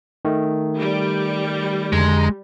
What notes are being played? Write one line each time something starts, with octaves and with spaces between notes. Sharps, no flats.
D#3 A3
G3
F2 D3 G#3 A#5